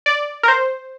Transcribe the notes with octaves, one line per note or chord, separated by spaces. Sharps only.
D5
A#4
C5